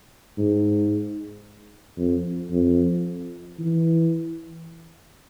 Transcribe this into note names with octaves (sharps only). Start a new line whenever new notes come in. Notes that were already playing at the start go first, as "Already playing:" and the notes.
G#2
F2
F2
E3